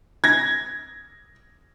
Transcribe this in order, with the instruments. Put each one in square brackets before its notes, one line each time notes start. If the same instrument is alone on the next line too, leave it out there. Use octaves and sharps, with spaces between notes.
[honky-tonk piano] G#6 A#6